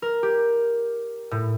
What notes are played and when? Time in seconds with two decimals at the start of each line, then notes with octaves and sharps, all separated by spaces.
0.02 A#4
0.23 G4
1.31 A2